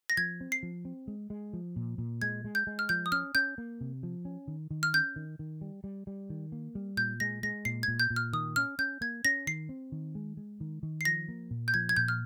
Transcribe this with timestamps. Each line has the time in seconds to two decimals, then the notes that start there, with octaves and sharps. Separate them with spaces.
0.10 A#6
0.17 F3 G#6
0.41 C4
0.52 C7
0.63 F3
0.85 C4
1.08 G#3
1.30 G#3
1.53 F3
1.76 A#2
1.98 A#2
2.22 G#3 G#6
2.44 G#3
2.55 G6
2.67 G#3
2.79 F6
2.89 F3 G6
3.06 D#6
3.12 C#4 F6
3.35 C#4 G6
3.58 A#3
3.81 C3
4.03 F3
4.25 C#4
4.48 D#3
4.71 D#3
4.83 F6
4.94 C#4 G6
5.16 D#3
5.39 D#3
5.61 G3
5.84 G3
6.07 G3
6.30 D#3
6.52 A#3
6.75 G3
6.97 A#2 G6
7.20 G#3 A#6
7.43 G#3 A#6
7.65 A#2 C7
7.83 A#2 G#6
8.00 G6
8.10 A#2
8.16 F6
8.33 D#3 D#6
8.56 C#4 F6
8.79 C#4 G6
9.01 A#3 G#6
9.25 C#4 A#6
9.47 D#3 C7
9.69 C4
9.92 D#3
10.15 G#3
10.37 G#3
10.61 D#3
10.83 D#3
11.01 C7
11.05 F3 A#6
11.29 A#3
11.51 A#2
11.68 G6
11.74 F3 G#6
11.89 G#6
11.97 A#2 G6
12.08 F6